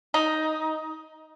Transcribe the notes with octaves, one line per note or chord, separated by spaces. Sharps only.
D#4